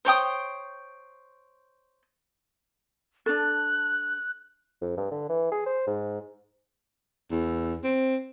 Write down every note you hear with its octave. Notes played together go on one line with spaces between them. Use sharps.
C5 C#5 G5 D#6
D4 A4 F#6
F2
G2
D3
E3
G#4
C5
G#2
E2
C4